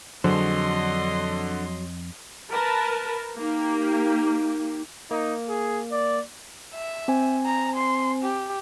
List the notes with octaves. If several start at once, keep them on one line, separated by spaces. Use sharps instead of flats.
F2 D3 F#3 G#4 C5 D#5 C6
A#4 B4 A5
A#3 D#4 G4
A#3 D#4
G#4
D5
E5
C4 C5 G#5
A#5
C6
G4